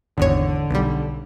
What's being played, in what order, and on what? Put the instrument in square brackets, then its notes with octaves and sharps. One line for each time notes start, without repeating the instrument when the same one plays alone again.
[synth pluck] G#1 E2 C#5 [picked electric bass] D3
[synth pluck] B1 G3